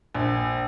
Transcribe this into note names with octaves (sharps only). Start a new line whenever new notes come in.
A#1